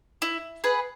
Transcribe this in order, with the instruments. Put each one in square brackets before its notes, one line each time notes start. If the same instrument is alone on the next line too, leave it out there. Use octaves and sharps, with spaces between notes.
[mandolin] E4
G#4 B4 F#5